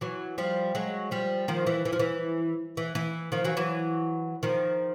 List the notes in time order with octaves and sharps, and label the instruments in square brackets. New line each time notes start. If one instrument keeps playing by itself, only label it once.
[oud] E3 F#3
F3 G3
F#3 G#3
F3 G3
D#3 F3
E3
E3
F3
E3
E3
E3
D#3 F3
E3 F#3
E3 F#3
D#3 F3